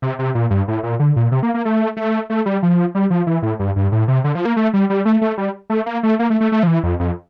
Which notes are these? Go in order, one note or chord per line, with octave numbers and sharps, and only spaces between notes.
C3
C3
A#2
G2
A2
A#2
D3
A#2
C3
A#3
A#3
A3
A3
A3
G3
F3
G3
F3
E3
A2
G2
G2
A2
C3
D3
F3
A#3
A3
G3
G3
A3
A3
G3
A3
A#3
A3
A#3
A3
A3
A3
F3
E3
F2
F2